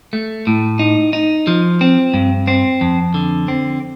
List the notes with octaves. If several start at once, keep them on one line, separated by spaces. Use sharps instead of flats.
A3
A2
D#4
D#4
F3
C4
G2
C4
F2
D3
C4